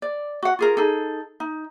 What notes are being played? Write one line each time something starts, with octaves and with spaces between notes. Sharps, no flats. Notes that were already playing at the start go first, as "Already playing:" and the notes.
D5
F#4 F#5
F4 G#4 A#4
D#4 G#4 A4
D#4